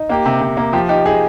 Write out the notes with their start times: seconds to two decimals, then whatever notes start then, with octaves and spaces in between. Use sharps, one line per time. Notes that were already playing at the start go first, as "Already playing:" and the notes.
Already playing: D#4
0.09 A#3 G4
0.26 C3
0.41 C3
0.57 A#3
0.73 F3 G4
0.89 D#4 G4
1.05 D#4 G#4